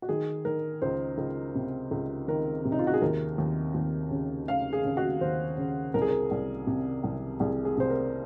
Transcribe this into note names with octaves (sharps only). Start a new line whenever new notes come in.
F#4
D#3 G#4
D#3 A#4
C#2 C5
C#2
C3
C#2
D#3 A#4
C3
D#4
F4
F#4
G#4
D#2 A#4
D#2
D#2
C#3
C#3 F5
G#4
C#3
F#4
D#2 C5
C#3
C2 A#4
G#4
A#4
C2
C3
C2
C2 G#4
G#4
C3 C5
A#4